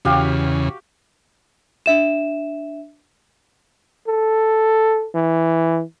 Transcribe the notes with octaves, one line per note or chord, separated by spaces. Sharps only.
E2 C#3 F#4 G4 F5
D4 E5 E7
A4
E3